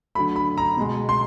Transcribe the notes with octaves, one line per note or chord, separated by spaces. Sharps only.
D3 F#3 A3 B5
B5
A#5
B2 G#3
C6